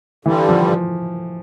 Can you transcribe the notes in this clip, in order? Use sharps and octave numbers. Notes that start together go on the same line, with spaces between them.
G2 D3 E3 G3
F3